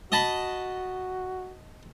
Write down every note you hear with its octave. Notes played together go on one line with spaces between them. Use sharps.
F#4 D#5 A5 B5